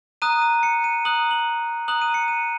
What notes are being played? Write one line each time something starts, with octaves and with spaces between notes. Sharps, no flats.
A#5 D#6 F#6 D#7
D#7
C#7
D#7
A#5 D#6 F#6 F#7
F#7
A#5 D#6 F#6 F#7
D#7
C#7
D#7